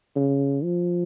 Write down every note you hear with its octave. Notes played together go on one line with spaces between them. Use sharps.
C#3
F3